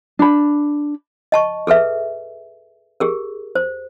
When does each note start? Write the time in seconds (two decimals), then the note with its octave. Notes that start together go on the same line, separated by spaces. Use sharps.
0.19 D4 B5
1.32 D#5 A5 C#6
1.67 G#4 A4 B4 E5
3.00 G4 G#4 A#4
3.55 C5